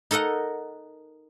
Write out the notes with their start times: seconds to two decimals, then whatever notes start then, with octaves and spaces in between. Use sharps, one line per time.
0.11 D#4 A4 A#4 D#5 F#5